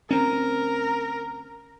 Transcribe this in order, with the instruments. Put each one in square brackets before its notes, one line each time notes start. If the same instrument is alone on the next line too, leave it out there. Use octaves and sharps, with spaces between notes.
[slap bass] D2 C4 C#4 [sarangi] A#4